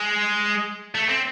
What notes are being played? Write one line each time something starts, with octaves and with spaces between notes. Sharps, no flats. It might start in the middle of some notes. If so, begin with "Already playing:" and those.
Already playing: G#3
A3
C4